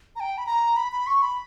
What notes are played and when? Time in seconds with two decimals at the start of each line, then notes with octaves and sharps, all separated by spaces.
0.16 A#5
0.20 G5
0.38 B5
0.46 A#5
0.76 B5
0.92 B5
1.07 C#6
1.22 B5